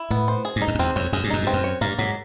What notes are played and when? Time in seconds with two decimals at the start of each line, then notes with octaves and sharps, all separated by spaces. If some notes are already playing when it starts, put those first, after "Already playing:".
Already playing: E4
0.10 A2 B3
0.28 C5
0.45 G#4
0.56 G2
0.61 D#4
0.68 F#2
0.75 F2
0.79 E2 C4
0.96 F2 C#5
1.12 F#2 G#4
1.24 G2
1.30 F#2 D#4
1.43 G2 C4
1.53 F#2
1.64 C#5
1.81 G2 A#3
1.98 G#2 F#3